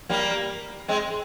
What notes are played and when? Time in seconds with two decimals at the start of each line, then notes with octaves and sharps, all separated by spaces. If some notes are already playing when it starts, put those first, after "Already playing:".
0.09 G3 A#3
0.88 G#3 C4